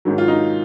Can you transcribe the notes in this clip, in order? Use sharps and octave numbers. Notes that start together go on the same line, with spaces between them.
G#2 D#3 F#3
F4
D#4